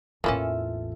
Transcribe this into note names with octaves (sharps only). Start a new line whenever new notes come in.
A1 E2 E3 A#3 C#4 F4 A4 E5